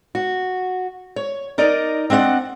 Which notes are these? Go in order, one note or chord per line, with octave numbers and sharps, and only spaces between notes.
F#4
C#5
D#4 A#4 D5 D#5
C4 D4 D#5 F5 F#5